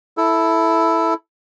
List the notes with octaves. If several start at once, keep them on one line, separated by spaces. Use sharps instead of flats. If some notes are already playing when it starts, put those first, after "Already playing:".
E4 A4